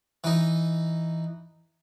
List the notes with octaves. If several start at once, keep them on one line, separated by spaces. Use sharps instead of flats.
E3 D#4